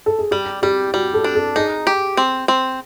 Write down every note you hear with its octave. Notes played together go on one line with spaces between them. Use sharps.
A4
G#4
G3 G4
G3 G4
G3 F#4
A4
D4
A4
D#4 G#4
G4
C4
C4